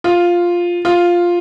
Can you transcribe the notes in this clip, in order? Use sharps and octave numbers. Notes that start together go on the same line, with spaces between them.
F4
F4